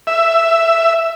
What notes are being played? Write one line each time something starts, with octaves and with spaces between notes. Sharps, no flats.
E5